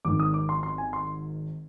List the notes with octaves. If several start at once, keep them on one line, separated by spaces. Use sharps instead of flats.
G#1 G#2 D#3 D6
D#6
D6
C6
C6
G#5
C6